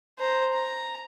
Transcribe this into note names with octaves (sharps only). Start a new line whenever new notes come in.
C5 A#5
A#5